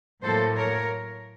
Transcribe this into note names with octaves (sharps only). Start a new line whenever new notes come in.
A2 F#3 A#3 A4 C5
A#4 C#5